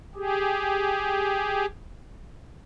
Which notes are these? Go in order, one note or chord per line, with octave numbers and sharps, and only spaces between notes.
G4 G#4